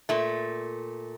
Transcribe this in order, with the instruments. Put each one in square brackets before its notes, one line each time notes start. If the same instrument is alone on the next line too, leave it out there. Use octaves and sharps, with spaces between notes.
[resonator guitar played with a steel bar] A#2 A3